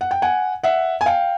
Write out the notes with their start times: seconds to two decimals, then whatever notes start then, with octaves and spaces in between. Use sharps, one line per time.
0.01 F#5
0.11 G5
0.22 F#5 G#5
0.63 E5 F#5
1.01 G#5
1.06 F5 G5